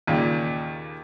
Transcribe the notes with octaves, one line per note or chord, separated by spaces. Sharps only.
D#2 A#2 C#3